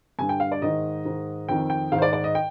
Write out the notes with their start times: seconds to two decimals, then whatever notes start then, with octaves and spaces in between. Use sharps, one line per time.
0.19 G2 D3 G#5
0.29 G5
0.40 F5
0.52 D5
0.62 G#2 D#3 D#5
1.05 G#2 D#3
1.49 F2 D#3 G5
1.70 G5
1.92 G#2 D#3 F5
1.98 C5
2.02 D5
2.13 D5
2.24 D#5
2.35 G5